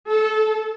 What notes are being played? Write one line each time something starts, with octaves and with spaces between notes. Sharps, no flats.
A4